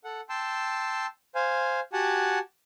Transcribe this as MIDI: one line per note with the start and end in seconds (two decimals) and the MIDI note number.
0.04 0.21 69
0.04 0.21 78
0.29 1.06 79
0.29 1.06 81
0.29 1.06 84
0.29 1.06 88
1.35 1.80 72
1.35 1.80 77
1.35 1.80 80
1.93 2.39 66
1.93 2.39 67
1.93 2.39 78
1.93 2.39 80
1.93 2.39 81